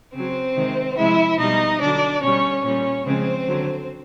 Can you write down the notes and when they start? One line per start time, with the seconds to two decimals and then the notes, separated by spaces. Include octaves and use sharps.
0.14 C#3 F#3 C4 C5
0.56 C3 D#3 G#3
0.98 C3 F3 G#3 E4 E5
1.39 B2 G3 D#4 D#5
1.81 D3 F#3 D4 D5
2.23 B2 G3 C#4 C#5
2.64 A#2 G3 C#4 C#5
3.06 C#3 F3 G#3 C4 C5
3.47 D3 F#3